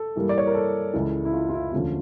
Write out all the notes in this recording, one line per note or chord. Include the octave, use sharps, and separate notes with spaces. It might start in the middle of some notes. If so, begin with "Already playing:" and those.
Already playing: A4
G2 E3 G3 A#3
D5
C#5
A#4
A4
C#2 C#3 E3
E4
F4
F4
E4
E1 D2 D3 F3 C#4 F4